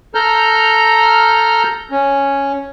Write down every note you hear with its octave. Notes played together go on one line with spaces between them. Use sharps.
A4 A#5 F6 G6
C#4